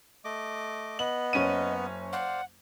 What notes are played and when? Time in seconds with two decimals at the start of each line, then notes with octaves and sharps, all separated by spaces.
0.25 A3 D#5 D6
0.99 B3 D#5 F#7
1.33 F#1 C#4 D#7
2.13 C5 D5 F5 F#5